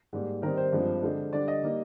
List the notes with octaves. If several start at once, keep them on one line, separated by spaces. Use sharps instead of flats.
G#2 G3 A#3
D#3 G3 C4 D#4 A#4
C5
G2 F3 G#3 C4
D3 G#3 D4
D3 G3 D4 D5
D#5
G3 A#3 D#4